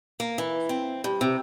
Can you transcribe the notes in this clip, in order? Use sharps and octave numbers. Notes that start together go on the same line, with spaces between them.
A#3
E3
C4
G2
C3